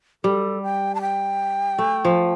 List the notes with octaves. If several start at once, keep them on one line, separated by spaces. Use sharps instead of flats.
G3 A4
G5
A5
G5
A3
F3